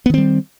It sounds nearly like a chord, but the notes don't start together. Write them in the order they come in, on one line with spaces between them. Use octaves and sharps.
B3 D#3 C4 G3